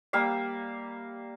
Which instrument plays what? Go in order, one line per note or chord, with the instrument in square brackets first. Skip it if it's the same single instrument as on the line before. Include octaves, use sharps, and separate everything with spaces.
[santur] G3 A#3 E5 F5